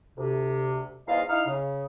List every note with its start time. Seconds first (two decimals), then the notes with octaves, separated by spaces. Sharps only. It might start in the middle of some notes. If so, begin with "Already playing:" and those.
0.17 D2 C3
1.07 E2 G#2 F4 D#5 F5
1.28 D#4 E4 F5 F6
1.46 C#3